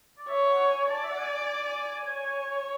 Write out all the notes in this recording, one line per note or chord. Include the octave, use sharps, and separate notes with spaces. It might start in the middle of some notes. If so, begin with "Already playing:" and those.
D5
C#5 E5
F#5
G#5
D5 A5
E5
F#5
G#5
G#5
C#5